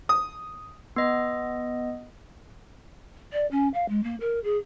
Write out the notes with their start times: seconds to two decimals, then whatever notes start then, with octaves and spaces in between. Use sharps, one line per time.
0.09 D#6
0.96 B3 D#5
3.32 D5
3.51 C#4
3.74 F5
3.89 G#3
4.03 A#3
4.20 A#4
4.44 G#4